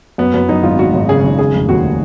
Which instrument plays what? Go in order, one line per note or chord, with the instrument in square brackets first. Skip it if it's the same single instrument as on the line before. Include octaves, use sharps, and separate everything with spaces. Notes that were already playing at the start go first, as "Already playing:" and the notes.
[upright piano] F#2 [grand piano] B3
[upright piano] F#2 [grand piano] B3
[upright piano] F#2 [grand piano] D#4
[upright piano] G#1 [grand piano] F4
[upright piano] G#1 [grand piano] F#4
[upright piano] G#1
[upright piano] C#3 [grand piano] G#4
[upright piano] G#1
[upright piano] C#3 [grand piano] G#4
[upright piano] F1
[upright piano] D#2 [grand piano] F#4